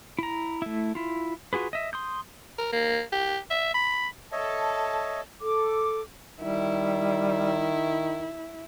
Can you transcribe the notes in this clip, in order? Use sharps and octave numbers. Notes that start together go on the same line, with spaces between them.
E4 A#5
A3 E4
E4 F4
F4 F#4 G#4 B4
D#5 E5
C6 D#6 G6
A#4
A#3
G4
E5
B5
A4 C#5 D#5 E5
A4 D6
D#3 G3 E4